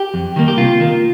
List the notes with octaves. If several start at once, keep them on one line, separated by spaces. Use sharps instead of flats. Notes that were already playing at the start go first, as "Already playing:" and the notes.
Already playing: G4
F2
D#3 G3 A#3
G4
C3 F4
D#3 A#3